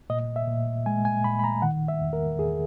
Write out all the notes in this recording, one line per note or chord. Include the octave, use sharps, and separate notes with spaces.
A#2 D#5
E5
A#2
G#3 G#5
G#5
A#2 B5
B5
A#5
D#3 F#5
E5
E2
A#4
E2 G#4